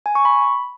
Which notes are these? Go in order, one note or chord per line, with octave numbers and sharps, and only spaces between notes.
G#5
C#6
B5